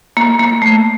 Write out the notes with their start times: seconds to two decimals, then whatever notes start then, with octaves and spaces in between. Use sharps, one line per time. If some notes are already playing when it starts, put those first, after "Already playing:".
0.17 A#3
0.39 A#3
0.62 A3